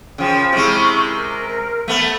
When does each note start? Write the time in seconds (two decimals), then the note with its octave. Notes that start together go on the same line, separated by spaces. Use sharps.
0.18 C#3 F3 A#4 G5 C6
0.53 C3 G#3 E4 C#6 F6
1.05 A#4
1.88 A3 B3